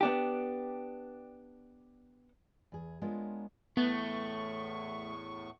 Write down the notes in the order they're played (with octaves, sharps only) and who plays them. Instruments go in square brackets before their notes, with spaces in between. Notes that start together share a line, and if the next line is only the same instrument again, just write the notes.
[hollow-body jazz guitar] B3 D4 G4
[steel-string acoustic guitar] E2 G#4
G#3 B3 D4 F4 A#4 C#5
[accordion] E2 A2 C#6 [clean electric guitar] A3 [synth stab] B3